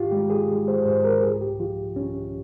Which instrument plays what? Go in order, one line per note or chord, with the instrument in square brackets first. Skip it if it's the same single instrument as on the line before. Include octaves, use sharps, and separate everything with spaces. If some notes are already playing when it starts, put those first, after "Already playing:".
Already playing: [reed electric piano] G#2 F4 G4
G#3 G4
G#4
G#3
C5
G#2 C5
A#4
C2 G#4
G4
F3 F4
C2 C#4